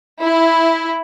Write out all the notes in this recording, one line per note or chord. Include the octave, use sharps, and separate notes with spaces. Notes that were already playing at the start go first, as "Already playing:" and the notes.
E4